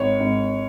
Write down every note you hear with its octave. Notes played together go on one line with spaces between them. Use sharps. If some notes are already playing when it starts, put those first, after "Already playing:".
Already playing: G#1 C#5
G#1